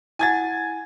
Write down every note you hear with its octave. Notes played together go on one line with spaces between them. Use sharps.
E4 F#5 G#5 G#6 A6